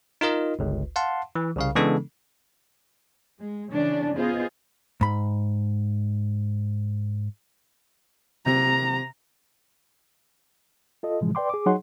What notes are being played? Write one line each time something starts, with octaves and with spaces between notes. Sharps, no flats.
D#4 F4 A#4 D#5
G1 C#2
F5 F#5 A5 C6
E3
C2 C#3 F5
C#3 E3 G#3 B3 D4 A4
G#3
C#3 E3 C#4 D4
B3 F4 G#4 C5 D#5
G#2 B5
C3 A#5
F4 A4 D#5
A2 C3 E3 F3 G#3
B4 D5 G5 C6 D6
G#4 D6
F#3 D#4 G#4 C#5 F#5 C6